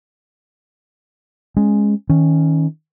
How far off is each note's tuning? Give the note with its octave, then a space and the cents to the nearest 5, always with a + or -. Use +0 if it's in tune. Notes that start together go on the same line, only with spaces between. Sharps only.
G#3 +0 C#4 -10
D#3 +30 C#4 +0